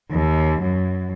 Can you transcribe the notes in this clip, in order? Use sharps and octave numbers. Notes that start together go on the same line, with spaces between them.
D#2
F#2